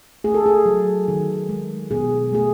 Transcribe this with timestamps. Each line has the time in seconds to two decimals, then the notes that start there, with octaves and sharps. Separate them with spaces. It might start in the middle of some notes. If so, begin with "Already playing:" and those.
0.24 A3 G#4
0.34 A4
0.46 G#4
0.66 F#3
1.08 D#3
1.49 G#3
1.91 B2 G#4
2.33 A3 G#4